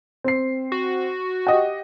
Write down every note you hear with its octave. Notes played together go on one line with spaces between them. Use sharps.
C4 C7
F#4
G4 D#5 F#5